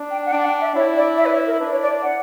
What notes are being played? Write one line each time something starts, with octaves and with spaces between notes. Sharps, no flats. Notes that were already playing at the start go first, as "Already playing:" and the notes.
Already playing: D4
G5
F#5
D4 G5
F#5
G5
E5
E4 C#5
D5
E5
B4
C#5
A#4
D4 B4
C#5
D5
F#5